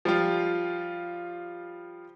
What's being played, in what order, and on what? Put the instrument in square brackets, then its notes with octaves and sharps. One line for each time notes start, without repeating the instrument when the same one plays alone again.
[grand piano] F3 G3 F4